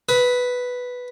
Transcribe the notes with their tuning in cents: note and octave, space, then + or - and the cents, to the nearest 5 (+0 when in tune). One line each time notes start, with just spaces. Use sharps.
B4 +0 D#6 +35